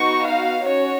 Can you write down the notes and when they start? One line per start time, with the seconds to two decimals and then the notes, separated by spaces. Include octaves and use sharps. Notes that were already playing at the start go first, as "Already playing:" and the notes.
Already playing: B3 D#4 F#4 C#6
0.24 F5
0.63 C#4 F#4 C#5